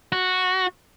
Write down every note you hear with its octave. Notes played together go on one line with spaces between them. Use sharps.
F#4